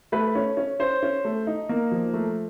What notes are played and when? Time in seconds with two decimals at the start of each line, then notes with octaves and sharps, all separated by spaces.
0.12 A3 B4
0.35 C#4
0.57 C#4
0.80 C#4 C5
1.03 C#4
1.25 A3
1.47 D#4
1.69 A#3
1.92 F3
2.14 A3